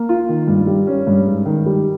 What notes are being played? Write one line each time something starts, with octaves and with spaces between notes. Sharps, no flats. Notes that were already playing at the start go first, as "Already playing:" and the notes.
Already playing: A#3
F4
D#3
G2
G3
C#4
G2
G#2
D#3
G3